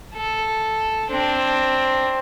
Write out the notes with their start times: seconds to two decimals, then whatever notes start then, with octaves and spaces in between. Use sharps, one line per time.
0.15 A4
1.11 C4 D4